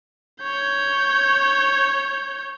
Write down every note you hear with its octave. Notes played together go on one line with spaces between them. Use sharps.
C#5 G6